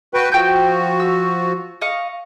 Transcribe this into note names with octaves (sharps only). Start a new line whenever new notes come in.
F#4 B4 G5
F3 F#4 G5 E6 G6
E6
D#5 F5 C#6